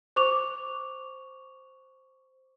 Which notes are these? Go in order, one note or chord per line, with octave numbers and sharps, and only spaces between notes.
C5 C#6 D6 F7